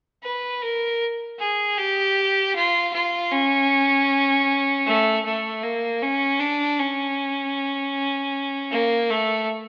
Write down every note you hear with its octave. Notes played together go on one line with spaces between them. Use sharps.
B4
A#4
G#4
G4
F4
F4
C#4
A3
A3
A#3
C#4
D4
C#4
A#3
A3